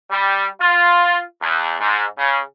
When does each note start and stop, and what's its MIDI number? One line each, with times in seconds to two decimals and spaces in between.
0.10 0.46 55
0.60 1.21 65
1.41 1.75 40
1.80 2.05 44
2.18 2.39 49